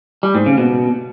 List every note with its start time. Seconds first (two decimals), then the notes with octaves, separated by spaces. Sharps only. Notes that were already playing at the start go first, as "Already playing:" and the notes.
0.23 G3
0.35 G#2
0.46 C#3
0.58 B2